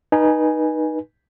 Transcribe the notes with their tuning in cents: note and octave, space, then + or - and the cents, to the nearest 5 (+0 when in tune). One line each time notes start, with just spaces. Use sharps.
D#4 -10 B4 -30 G#5 +0